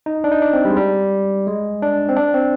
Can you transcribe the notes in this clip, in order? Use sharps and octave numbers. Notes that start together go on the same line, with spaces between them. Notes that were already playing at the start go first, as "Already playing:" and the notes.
D#4
D4
D#4
D4
C4
G3
G#3
G3
G#3
D4
C4
D4
C4